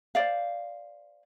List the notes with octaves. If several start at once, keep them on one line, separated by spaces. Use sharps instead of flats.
C5 D5 F5